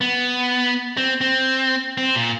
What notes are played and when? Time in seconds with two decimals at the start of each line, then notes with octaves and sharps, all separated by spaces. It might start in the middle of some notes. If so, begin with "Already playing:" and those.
0.01 B3
0.97 C4
1.21 C4
1.98 C4
2.15 A#2